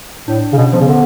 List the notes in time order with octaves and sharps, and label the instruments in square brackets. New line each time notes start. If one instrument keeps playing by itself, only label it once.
[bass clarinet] A2 [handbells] D4
[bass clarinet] C#3
[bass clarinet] B2 [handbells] C#4
[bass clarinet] F3 [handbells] B3
[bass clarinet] C#3
[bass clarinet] D3 [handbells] B3